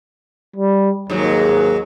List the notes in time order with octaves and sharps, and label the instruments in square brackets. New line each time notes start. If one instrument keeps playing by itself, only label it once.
[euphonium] G3
[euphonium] D#2 [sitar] G#2 F#3